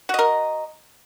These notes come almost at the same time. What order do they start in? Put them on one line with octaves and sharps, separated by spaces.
F#4 D#5 A#4